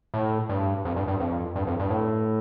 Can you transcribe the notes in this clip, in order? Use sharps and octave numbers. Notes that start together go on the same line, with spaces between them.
A2
G2
F2
G2
G2
F2
G2
F2
G2
A2